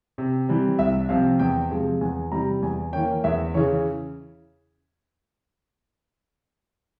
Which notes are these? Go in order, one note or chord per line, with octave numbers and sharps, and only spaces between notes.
C3
E3 G3 C4
C2 E5
C3 F3 C4 F5
E2 G5
C3 F3 G#3 C4
E2 G#5
C3 E3 G3 A#5
E2 G#5
E3 A#3 C#4 G5
E2 E5
C#3 E3 C#5